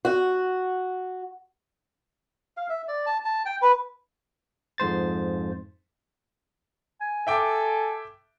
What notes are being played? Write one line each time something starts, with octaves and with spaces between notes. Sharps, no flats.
F#4
F5
E5
D5
A5
A5
G5
B4
F2 G#2 C5 A6
G#5
A4 E5 G5 D6